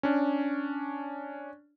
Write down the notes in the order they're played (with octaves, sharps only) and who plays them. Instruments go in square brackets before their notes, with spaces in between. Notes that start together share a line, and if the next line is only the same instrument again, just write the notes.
[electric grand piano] C#4 D4